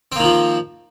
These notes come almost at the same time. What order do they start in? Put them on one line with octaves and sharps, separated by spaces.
C4 A#3 D#3 F3